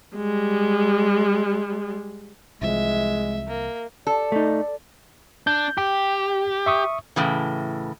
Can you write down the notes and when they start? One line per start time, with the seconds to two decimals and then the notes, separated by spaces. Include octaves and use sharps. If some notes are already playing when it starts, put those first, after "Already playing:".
0.16 G3 G#3
2.62 C2 E3 F3 G#3 E5
3.48 A#3
4.07 A4 D5
4.32 A3 D#4
5.47 D4 G6
5.78 G4 G5
6.66 E5 C#6 D#6
7.16 A2 C#3 E3